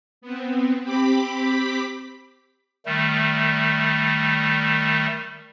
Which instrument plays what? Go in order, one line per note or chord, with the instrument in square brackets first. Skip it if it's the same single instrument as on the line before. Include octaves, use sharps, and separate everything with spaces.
[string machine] B3 C4
C4 G4 B5 D6 B6
[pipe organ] D#3 G3 A3